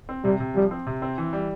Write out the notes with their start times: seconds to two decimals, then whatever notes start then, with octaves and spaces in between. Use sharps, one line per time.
0.09 C4
0.24 C3 G3
0.40 C3
0.55 F3 G3
0.71 C4
0.87 C3
1.02 C4
1.18 E3
1.33 G3